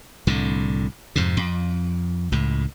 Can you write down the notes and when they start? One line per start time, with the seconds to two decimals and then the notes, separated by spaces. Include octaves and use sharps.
0.27 C2 A2 D3
1.16 F2 G#2 C3
1.37 F2
2.32 C#2 A2